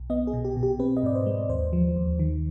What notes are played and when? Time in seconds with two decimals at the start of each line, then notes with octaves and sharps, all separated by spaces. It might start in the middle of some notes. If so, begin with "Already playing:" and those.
Already playing: B1
0.10 B3 D#5
0.27 G#4
0.33 B2
0.45 G4
0.56 B2
0.63 G4
0.80 C4 B4
0.97 D#5
1.03 G#2 D5
1.15 C5
1.26 G#3
1.49 D#2 C5
1.73 F3
1.96 D#2
2.19 D#3